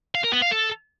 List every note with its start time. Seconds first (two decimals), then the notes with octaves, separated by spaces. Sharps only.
0.15 F5
0.24 A#4
0.33 B3
0.42 F5
0.51 A4